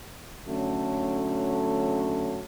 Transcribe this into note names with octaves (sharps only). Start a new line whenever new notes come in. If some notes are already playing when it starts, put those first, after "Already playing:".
D3 F#3 A3 C#4